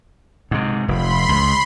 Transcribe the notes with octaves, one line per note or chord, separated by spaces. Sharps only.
G#2 C3
F1 B5 C6
C#2